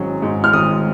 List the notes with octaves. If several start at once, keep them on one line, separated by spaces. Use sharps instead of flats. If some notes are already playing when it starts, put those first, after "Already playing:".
Already playing: G#1 G#2 F#3 C#4
G#2
F6
G#1 D#6